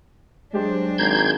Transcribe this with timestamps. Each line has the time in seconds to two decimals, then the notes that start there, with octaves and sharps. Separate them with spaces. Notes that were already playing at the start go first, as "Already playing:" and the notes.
0.53 F#3 G#3 D4 G4 C5
0.98 G#1 A#5 G6 G#6 C7